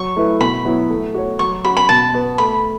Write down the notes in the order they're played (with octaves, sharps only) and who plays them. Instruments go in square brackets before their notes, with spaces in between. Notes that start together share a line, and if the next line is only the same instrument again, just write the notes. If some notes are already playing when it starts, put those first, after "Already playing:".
Already playing: [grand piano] F#3 [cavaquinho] C#6
[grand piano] A3 E4 B4 E5
[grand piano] B2 [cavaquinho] B5
[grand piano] F#3 B3 E4 C#5
A3
F#4 C#5
[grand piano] F#3 [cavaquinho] C#6
[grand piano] C#4 F#4 [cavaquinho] B5
[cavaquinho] B5
[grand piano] B2 [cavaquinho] A5
[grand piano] B3 F#4 B4
[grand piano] A3 [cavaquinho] B5